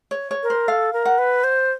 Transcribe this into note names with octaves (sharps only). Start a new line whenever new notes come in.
C#5
C#5
A#4
C5
A4 F5
A#4
F#5
B4
C5